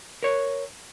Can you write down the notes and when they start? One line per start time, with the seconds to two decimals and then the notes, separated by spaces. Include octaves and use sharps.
0.23 A#4 C#5